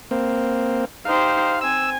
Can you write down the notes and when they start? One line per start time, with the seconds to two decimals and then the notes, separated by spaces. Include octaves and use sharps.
0.11 A#3 C4
1.05 D#4 G4 C5 F5
1.61 C4 G#5 E6